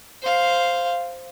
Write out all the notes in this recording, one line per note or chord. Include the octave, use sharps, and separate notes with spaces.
C5 F5